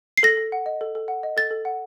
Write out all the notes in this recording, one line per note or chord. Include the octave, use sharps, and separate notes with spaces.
C7
A4 A#6
A4
F#5
D#5
A4
A4
F#5
D#5
A4 A6
A4
F#5